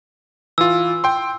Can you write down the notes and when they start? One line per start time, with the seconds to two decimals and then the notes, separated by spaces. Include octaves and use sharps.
0.58 E3 F4 E6
1.04 G5 C6